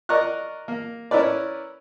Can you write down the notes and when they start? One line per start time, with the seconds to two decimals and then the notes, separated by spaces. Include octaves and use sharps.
0.09 A#4 D5 D#5 A#5 C#6 F#6
0.68 A#3
1.11 C#4 E4 A#4 B4 D5